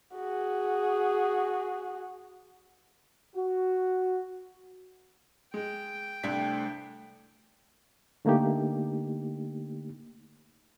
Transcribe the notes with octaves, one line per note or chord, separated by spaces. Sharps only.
F#4 G#4
F#4
G#3 G5
C2 A3 C4 D4 B6
D3 A3 A#3 D#4 G4